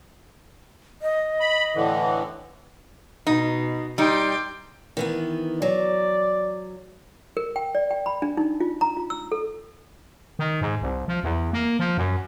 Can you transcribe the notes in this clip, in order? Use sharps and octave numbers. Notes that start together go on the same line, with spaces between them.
D#5
B5
A2 D3 E3
B2 D#4
G3 D#4 G5 C6 D6
D#3 E3 B3
F#3 D5
A#4
G5
D5
G5
B5
D4
D#4
F4
A#5
F4
E6
A4
D#3
G#2
C2
F3
E2
A#3
F3
F#2